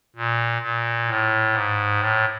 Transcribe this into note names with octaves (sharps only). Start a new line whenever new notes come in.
A#2
A#2
A2
G#2
A2